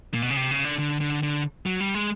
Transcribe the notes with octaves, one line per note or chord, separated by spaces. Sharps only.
A#2
B2
C#3
C3
C#3
D3
D3
D3
D3
F#3
G3
G#3